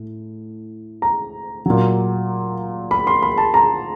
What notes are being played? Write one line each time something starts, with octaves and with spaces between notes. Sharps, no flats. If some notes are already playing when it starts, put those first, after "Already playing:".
Already playing: A2
A#5
A#2 F#3
B5
C6
B5
A5
A#5